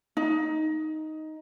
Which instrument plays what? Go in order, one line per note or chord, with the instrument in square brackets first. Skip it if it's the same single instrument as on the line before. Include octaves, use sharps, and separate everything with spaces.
[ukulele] D#4